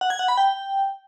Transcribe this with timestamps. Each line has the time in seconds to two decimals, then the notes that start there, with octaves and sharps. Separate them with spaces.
0.01 F#5
0.10 G#6
0.19 F#5
0.28 B5
0.38 G5